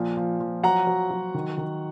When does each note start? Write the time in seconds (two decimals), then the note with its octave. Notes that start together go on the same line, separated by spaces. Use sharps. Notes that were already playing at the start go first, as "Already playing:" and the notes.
Already playing: A#2 F3
0.17 F3
0.40 F3
0.63 F#3 F#5 A#5
0.87 F#3
1.11 F#3
1.34 D#3
1.58 D#3